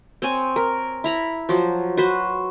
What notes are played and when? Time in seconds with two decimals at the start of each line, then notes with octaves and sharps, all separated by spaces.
0.22 C4 C#5 G#5
0.56 A#4
1.04 E4 A#5 B5
1.49 F3 F#3
1.97 F#4 B4 C5